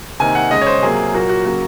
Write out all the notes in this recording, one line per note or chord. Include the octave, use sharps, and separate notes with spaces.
C3 D#3 A#3 G#5
F#5
C#3 G#3 D#5
C#5
C5
C3 F#3 A#3 G#4
A#2 F#3 A#3 F#4
F#4
C#3 F#3 A#3 F#4